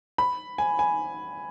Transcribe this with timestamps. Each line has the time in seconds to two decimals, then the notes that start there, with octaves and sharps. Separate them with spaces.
0.18 B5
0.58 G#5
0.79 G#5